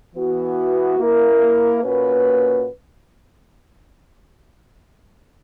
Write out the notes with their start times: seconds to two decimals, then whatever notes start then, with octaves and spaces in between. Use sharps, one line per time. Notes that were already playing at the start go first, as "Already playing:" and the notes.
0.15 E3 B3 F#4
0.99 A#3 E4 A#4
1.84 A#2 A#3 C#4 F#4 B4